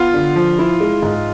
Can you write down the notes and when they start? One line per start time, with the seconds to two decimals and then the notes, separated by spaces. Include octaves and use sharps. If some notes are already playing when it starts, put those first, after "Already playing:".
Already playing: B3 F4
0.14 D3
0.36 F3
0.59 E4
0.80 G#3
1.02 G#2